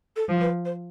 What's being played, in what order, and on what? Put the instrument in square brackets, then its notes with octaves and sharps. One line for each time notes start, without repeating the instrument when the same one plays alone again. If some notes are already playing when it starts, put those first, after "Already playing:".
[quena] A4
[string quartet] F3
[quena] B4
C5